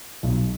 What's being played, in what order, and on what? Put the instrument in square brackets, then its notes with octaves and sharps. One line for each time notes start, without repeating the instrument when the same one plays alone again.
[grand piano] B1